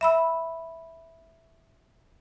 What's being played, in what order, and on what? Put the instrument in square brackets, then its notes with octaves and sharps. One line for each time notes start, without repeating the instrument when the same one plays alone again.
[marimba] E5 B5 E6